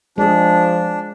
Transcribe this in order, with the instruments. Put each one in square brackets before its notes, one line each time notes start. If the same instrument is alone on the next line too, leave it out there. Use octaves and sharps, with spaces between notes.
[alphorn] F3 [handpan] G#3 G#4 [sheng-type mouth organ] D4